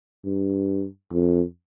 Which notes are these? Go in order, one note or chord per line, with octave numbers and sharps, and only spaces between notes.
G2
F2